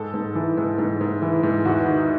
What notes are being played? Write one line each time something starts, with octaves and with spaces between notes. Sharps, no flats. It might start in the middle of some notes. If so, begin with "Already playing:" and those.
Already playing: G#2 A4
G#2
E3
G#2
G#2
G#2
E3
G#2
E2 F#4
D#3